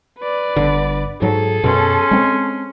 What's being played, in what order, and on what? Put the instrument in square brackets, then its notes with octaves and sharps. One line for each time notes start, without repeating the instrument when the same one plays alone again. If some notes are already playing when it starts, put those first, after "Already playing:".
[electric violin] B4 D5
[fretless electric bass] G1 D3
[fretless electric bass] G#2 F#3 [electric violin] G#4 A4
[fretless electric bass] F#2 B2 [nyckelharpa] C#4 C6
[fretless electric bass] G#3 C4